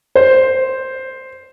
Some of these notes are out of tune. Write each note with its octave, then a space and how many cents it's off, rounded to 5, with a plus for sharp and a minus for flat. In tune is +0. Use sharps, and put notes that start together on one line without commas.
C5 +0